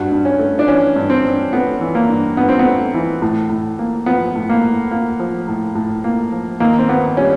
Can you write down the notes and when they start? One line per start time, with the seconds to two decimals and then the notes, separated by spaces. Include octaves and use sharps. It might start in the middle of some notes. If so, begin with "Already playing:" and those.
Already playing: G2 F#4
0.12 G2
0.25 C#4
0.39 A3
0.59 D4
0.67 E3 C#4
0.96 G2
1.10 C4
1.24 G2
1.53 A3 B3
1.81 E3
1.95 A#3
2.09 G2
2.37 G2 B3
2.49 C4
2.59 B3
2.65 A3
2.94 E3
3.22 A2
3.50 A2
3.79 A#3
4.06 F3 B3
4.35 A2
4.50 A#3
4.63 A2
4.91 A#3
5.19 F3
5.48 A2
5.75 A2
6.04 A#3
6.32 F3
6.60 D#2 A#3
6.79 C4
6.89 A#3 B3
7.17 G3 C#4